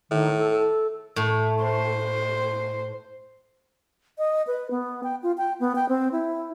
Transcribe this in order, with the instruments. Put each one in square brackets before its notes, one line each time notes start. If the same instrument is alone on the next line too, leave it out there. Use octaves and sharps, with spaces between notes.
[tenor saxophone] A2 [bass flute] D#3
[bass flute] A4
A4
[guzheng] A2
[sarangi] C5
[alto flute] D#5
B4
B3
G5
F4
G5
B3
G5
C4
E4